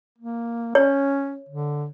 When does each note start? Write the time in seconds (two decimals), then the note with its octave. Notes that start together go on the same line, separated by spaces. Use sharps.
0.18 A#3
0.75 C#4 C#5
1.49 D3